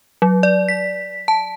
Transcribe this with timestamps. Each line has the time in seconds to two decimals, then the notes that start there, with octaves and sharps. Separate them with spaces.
0.22 F#3
0.43 D5
0.68 B6
1.28 A5